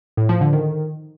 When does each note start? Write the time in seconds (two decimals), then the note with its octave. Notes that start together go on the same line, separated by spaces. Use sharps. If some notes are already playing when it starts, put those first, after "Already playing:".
0.17 A2
0.29 F3
0.41 D3
0.53 D#3